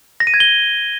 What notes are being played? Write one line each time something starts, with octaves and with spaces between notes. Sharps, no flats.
A#6
D#7
G#6
G7